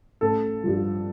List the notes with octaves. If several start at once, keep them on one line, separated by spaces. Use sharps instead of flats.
A1 A4
G2 F3